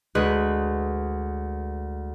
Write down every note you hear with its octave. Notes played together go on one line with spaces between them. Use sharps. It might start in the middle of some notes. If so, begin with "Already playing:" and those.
D2 G#3 G#4 B4 F#6